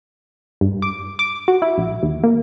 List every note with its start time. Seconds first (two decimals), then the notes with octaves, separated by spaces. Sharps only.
0.61 G2
0.82 D6
1.19 D6
1.48 F#4
1.62 E4
1.78 A#1
2.03 D#2
2.23 A#3